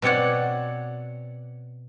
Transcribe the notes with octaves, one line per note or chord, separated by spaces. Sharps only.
B2 C4 C#5 D5 F#5